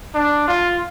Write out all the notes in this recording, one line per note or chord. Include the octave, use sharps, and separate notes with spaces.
D4
F4